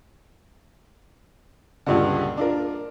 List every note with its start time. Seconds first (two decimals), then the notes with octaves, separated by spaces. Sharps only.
1.86 C#2 G2 A#2 D3
2.37 D4 F4 A#4